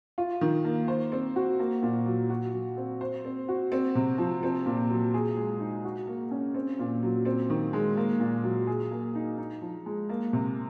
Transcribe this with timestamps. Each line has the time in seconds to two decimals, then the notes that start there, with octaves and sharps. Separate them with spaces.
0.18 F4
0.41 D#3
0.64 A#3
0.88 C5
1.12 C4
1.36 F#4
1.60 A#3
1.82 A#2
2.06 F#3
2.30 F#4
2.53 F#3
2.77 C4
3.01 C5
3.25 C4
3.48 F#4
3.72 C4
3.95 C3
4.18 F3
4.43 C4
4.66 A#2
4.90 F#3
5.14 G#4
5.37 G#3
5.60 D#4
5.85 F#4
6.07 A#3
6.31 C#4
6.54 C4
6.79 A#2
7.03 F#3
7.25 C4
7.50 D#3
7.73 G#3
7.97 A#3
8.20 A#2
8.43 F#3
8.67 G#4
8.91 A#3
9.15 D#4
9.38 D#4
9.61 F3
9.86 G#3
10.09 A#3
10.33 C3